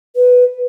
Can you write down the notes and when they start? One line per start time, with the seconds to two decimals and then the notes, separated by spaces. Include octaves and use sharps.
0.16 B4